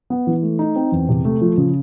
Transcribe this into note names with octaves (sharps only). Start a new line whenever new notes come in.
B3
E3
A3
D#4
C4
E2
C3
A3
F3
C#3